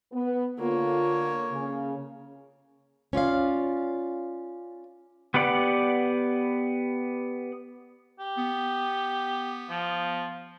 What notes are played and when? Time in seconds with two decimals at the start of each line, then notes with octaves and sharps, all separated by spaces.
0.13 B3
0.59 D3 A#3 F4 C#5
1.52 C#3
3.13 C#4 F4 D5 F5
5.34 B3 G4 B4 D5 F#5
8.20 G4
8.37 B3
9.70 F3